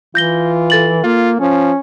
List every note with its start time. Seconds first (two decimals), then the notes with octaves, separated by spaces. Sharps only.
0.15 E3 F4 G6 A#6 G7
0.70 A4 A6 F#7
1.04 A#3 F4
1.40 F3 C#4